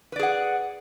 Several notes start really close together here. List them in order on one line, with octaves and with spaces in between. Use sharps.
B4 D5 G#4 F#5